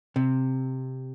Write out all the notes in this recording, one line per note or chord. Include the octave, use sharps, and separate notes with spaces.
C3